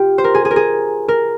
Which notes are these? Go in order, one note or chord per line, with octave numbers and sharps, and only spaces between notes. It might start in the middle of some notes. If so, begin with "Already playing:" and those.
Already playing: F4 G4
C5
A#4
G#4
G#4
A#4
G#4
A#4